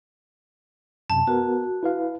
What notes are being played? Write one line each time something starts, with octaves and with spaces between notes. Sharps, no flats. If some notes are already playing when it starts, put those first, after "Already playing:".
F#2 C3 A5
B3 F#4 A#4
E4 B4 F5